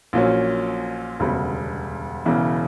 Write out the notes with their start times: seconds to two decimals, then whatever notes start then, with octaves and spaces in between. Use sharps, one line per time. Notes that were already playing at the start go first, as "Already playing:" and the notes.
0.13 A#1 A#2 F#3 C#4
1.20 E1 D2 C#3 G3 B3
2.26 E1 E2 C#3 E3